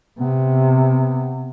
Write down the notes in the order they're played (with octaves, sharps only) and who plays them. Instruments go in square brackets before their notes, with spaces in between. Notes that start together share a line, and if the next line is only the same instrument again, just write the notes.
[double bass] C3 [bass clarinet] B3